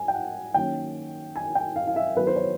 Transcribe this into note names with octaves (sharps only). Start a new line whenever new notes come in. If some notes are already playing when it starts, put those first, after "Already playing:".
Already playing: G#5
G5
F#5
D#3 F#3 A#3 C#4 G5
G#5
G5
F5
F5
E5
D#3 F#3 B3 B4
C5
C#5